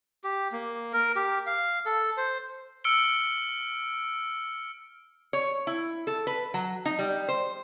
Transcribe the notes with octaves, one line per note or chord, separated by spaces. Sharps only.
G4
A#3
A#4
G4
F5
A4
C5
E6 F6 C#7 D7 G7
C#5
E4
A4
B4
F#3
D#4
G3
C5